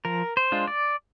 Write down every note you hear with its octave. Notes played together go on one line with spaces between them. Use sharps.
F3 A#4
C5
G#3 D4 F4
D5